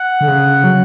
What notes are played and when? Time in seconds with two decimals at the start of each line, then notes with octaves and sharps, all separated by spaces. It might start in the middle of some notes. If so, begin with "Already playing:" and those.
Already playing: F#5
0.21 D3
0.28 C#3
0.64 F#3